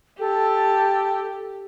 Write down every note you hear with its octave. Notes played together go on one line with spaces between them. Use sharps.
G4 A4